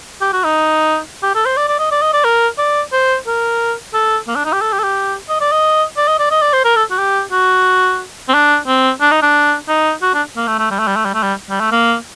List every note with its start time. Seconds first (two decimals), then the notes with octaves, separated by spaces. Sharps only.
0.21 G4
0.33 F#4
0.44 D#4
1.23 G4
1.35 A4
1.46 C5
1.57 D5
1.68 D5
1.79 D#5
1.91 D5
2.02 D#5
2.13 D5
2.24 A#4
2.58 D5
2.92 C5
3.26 A#4
3.93 A4
4.27 A#3
4.36 D4
4.45 D#4
4.53 G4
4.61 A4
4.72 G4
4.79 A4
4.83 G4
5.29 D#5
5.40 D5
5.52 D#5
5.97 D5
6.08 D#5
6.19 D5
6.31 D#5
6.42 D5
6.53 C5
6.65 A#4
6.76 A4
6.91 F#4
6.98 G4
7.31 F#4
8.29 C4
8.34 D4
8.67 C4
9.01 D4
9.11 D#4
9.22 D4
9.68 D#4
10.02 F#4
10.14 D4
10.36 A#3
10.47 A3
10.58 A3
10.70 G3
10.79 A3
10.87 G3
10.96 A3
11.05 G3
11.14 A3
11.23 G3
11.49 G3
11.60 A3
11.72 A#3